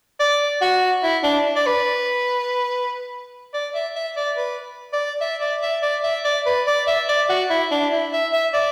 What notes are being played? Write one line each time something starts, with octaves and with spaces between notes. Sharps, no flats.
D5
F#4
E4
D4
D5
B4
D5
E5
E5
D5
B4
D5
E5
D5
E5
D5
E5
D5
B4
D5
E5
D5
F#4
E4
D4
E4
E5
E5
D5